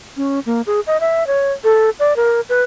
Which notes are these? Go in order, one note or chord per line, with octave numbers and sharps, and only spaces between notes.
C#4
A#3
G#4
D#5
E5
C#5
A4
D5
A#4
B4